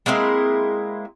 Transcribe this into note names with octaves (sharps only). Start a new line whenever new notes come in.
G#3 A#3 C4 E4